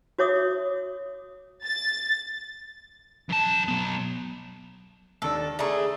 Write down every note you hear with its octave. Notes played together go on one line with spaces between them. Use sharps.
F#4 C#5 E5 D6 D#6
A6
F#2 A5
F#3 B3
D#2 D#3 D4 A4
A3 G#4 D5 A#5